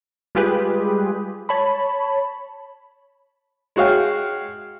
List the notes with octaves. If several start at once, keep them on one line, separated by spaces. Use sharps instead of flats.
G3 G#3 F4 G4 G#4 B4
C#5 A5 B5
G#3 F#4 C#5 F5 G5